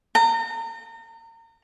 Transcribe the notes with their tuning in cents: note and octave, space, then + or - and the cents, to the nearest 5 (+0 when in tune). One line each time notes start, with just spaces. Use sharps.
A#5 -35